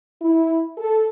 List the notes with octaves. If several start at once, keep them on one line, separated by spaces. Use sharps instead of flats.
E4
A4